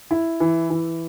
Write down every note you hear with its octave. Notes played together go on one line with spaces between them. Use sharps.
E4
E3
E3